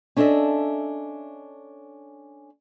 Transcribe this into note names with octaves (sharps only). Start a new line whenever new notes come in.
C#4 D4 A4 B4 D#5 E5